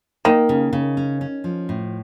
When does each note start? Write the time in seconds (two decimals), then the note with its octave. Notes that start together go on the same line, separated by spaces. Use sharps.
0.25 D#3 A#3
0.49 C#3
0.73 C#3
0.97 C#4
1.21 C#4
1.44 F3
1.69 A2